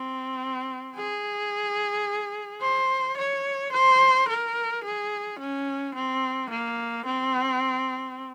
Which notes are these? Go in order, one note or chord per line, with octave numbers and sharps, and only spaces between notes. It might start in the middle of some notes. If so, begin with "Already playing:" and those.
Already playing: C4
G#4
C5
C#5
C5
A#4
G#4
C#4
C4
A#3
C4